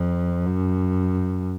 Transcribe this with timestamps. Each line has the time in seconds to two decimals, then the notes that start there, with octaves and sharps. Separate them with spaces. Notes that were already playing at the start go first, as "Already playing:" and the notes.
Already playing: F2
0.46 F#2